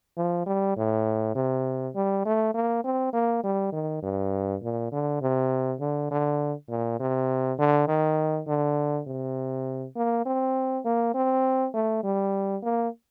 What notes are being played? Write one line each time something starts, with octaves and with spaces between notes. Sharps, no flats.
F3
G3
A2
C3
G3
A3
A#3
C4
A#3
G3
D#3
G2
A#2
D3
C3
D3
D3
A#2
C3
D3
D#3
D3
C3
A#3
C4
A#3
C4
A3
G3
A#3